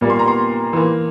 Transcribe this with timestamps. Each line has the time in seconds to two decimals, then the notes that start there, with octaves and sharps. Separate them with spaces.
0.01 A#2 G3 A#3
0.10 C6
0.19 A#5
0.28 C6
0.73 E3 A#3